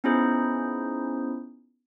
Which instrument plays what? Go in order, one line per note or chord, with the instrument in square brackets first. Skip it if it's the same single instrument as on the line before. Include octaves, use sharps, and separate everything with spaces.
[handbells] B3 C#4 D#4 E4 G#4 C5